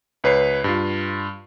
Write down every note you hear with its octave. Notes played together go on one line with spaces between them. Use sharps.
C#2 B4 C#5 C7
G2 F4